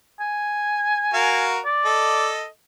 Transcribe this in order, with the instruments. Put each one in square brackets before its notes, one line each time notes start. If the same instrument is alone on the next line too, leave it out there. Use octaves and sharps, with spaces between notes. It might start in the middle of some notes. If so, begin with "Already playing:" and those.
[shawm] G#5
[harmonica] F#4 A#4 F5
[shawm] D5
[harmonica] A4 D#5